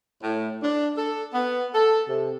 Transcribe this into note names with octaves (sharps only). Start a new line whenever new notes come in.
A2
D4
A4
B3
A4
C3